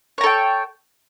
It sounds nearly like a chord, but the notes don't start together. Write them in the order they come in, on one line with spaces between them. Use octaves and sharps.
C#5 A#5 A4 G5